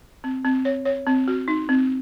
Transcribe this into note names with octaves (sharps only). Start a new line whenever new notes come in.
C4
C4
C#5
C#5
C4
F#4
D#4
C4